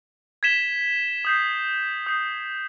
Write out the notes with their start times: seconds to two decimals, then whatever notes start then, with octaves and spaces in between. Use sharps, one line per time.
0.43 G#6 B6 E7 G7
1.25 D#6 G6 C7
2.06 D#6 G6 C7